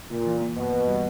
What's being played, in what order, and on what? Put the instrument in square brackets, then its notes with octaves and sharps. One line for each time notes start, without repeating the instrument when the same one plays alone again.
[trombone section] A#2 [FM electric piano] C#3
[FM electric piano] E3
A#3
[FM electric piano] G2 [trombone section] B2
[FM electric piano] E3
G3